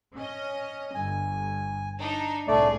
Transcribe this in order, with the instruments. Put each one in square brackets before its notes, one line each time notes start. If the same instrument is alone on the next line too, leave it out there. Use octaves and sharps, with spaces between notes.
[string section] C#4 D#5
[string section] G1 [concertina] G#5
[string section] D4 D#4
[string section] C2 A2 G#4 [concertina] A3 D5